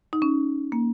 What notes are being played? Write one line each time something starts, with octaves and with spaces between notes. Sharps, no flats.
D#4
C#4
A#3